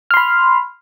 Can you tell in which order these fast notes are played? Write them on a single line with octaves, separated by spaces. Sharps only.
F6 C6 B5